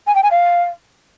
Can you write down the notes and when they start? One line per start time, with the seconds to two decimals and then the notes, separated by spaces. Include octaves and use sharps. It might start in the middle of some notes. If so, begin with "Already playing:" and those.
0.07 G#5
0.15 G5
0.23 G#5
0.31 F5